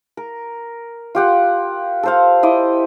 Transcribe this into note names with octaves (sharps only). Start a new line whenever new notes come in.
A#4
F4 G4 F#5
A4 C5 F5
E4 D#5 D6